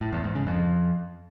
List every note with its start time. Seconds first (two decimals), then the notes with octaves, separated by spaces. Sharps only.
0.01 A2
0.13 E2
0.24 G#2
0.35 C#3
0.47 F2